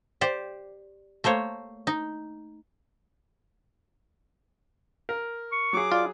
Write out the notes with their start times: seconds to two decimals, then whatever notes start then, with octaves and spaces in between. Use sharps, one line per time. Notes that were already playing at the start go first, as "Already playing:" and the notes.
0.21 G4 C5 D5
1.24 A3 A#3 C5 C#5
1.87 D#4
5.09 A#4
5.52 C#6
5.73 F#3 G#4 D6
5.92 F4 D5